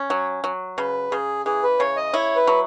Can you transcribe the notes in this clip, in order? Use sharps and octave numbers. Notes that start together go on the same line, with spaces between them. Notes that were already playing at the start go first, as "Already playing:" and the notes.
Already playing: C#4
F#3 C#5
F#3
C#3 B4
C#3 G#4
E3 G#4
B4
C#3 C#5
D#5
E4 C#5
B4
F#3